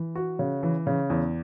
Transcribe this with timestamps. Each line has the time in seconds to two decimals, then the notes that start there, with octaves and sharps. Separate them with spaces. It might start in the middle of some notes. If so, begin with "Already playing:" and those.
Already playing: E3
0.15 F#4
0.39 C#3
0.63 E3
0.87 C#3
1.10 E2